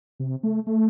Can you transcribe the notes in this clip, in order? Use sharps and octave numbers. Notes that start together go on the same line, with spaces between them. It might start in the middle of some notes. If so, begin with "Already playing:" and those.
C3
A3
A3